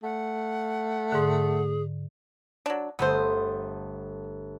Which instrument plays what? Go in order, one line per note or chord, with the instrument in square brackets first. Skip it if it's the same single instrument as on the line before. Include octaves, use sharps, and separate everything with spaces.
[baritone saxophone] A3 [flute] F#5
[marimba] G#2 D3 [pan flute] G#4
[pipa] F#3 D4
[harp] G1 A3 D#6 [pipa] B3 C4 C5